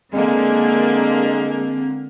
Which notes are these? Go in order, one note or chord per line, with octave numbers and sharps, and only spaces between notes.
D3 G#3 A#3 C4